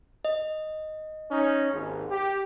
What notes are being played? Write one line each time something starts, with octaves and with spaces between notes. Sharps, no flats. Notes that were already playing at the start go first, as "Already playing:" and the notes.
D#5
C#4 D#4
G#1 D#2 G#2
G4